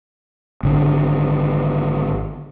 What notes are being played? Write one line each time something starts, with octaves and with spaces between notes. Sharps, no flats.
G#1 D3